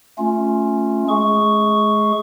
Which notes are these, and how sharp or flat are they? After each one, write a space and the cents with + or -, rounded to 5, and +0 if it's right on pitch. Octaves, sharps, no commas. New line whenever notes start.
A3 +0 C#4 +0 F4 +10
G#3 +35 G#4 +0 C#6 +0